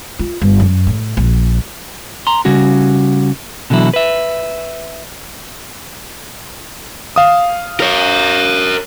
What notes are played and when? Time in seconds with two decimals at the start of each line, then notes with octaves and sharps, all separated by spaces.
0.19 F4
0.41 G1
0.60 F#2
0.87 A2
1.17 A#1
2.27 A#5 C6
2.45 C#3 G3 C#4 F#4
3.70 B2 D3 E3 F#3 E4
3.94 B4 E5
7.16 F5 D#6
7.80 A#4 C#5